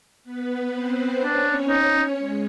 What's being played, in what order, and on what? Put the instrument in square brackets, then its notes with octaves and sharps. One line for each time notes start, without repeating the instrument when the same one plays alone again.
[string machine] B3 B4
C4 C5
[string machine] C#4 C#5 [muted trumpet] D4
[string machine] C#4 C#5 [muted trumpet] D#4
[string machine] G#3